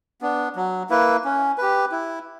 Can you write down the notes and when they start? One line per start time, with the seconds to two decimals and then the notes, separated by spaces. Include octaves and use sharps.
0.21 B3 D4
0.56 F#3
0.90 A#3 E4 B4
1.24 C#4
1.58 G4 B4
1.92 E4